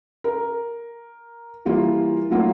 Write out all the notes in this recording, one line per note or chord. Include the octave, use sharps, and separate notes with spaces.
A#4
E3 G3 A#3 F4
F#3 A3 A#3 F4